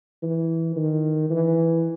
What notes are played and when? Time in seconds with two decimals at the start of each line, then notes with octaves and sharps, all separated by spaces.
0.22 E3
0.76 D#3
1.30 E3